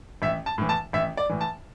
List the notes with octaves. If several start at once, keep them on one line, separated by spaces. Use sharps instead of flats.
A1 E5
A5
A2 E3
A5
A1 E5
D5
A2 E3
A5